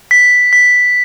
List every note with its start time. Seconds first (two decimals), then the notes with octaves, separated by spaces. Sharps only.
0.11 B6
0.53 B6